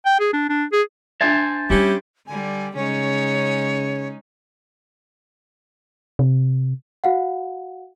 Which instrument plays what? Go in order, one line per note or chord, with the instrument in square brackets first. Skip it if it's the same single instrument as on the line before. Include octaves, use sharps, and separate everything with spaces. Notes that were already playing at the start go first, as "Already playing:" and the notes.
[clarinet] G5
G#4
D4
D4
G#4
[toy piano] D4 E5 [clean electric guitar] C5 G#5 A5
[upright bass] G3 A#3 [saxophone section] C#4 E4 G4
[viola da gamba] D3 G3 [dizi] G#5
[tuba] C#3 [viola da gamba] G#3 C#4 D#4 [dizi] C#5
[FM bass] C3
[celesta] F#4 F5 F#5